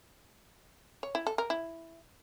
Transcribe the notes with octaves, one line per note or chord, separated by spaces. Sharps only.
C#5
E4
A4
A#4
E4